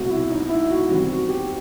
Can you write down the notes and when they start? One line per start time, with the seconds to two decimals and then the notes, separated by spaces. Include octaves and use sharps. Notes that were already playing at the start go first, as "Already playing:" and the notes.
Already playing: C2 B2 A3 C4 F#4
0.10 E4
0.30 D#4
0.49 E4
0.69 F#4
0.89 E2 D#3 G3 C4 F#4
1.09 F#4
1.29 G4